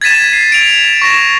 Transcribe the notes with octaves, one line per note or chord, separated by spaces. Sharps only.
G#6 A6 B6 D#7 E7
C7
D7 F7
C#6 A#6 E7